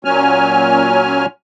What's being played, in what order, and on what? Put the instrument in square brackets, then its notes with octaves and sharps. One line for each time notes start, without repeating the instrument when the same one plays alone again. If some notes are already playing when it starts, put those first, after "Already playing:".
[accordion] A#2 F#3 C#4 G#5 F6